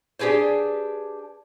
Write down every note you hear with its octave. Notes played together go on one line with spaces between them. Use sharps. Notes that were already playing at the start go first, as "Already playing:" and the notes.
D4 G4 G#4 B4 C5